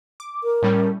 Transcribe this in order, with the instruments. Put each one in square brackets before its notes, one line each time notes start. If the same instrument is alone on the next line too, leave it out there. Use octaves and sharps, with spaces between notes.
[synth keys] D6
[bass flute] A#4
[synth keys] A2 G3 C#4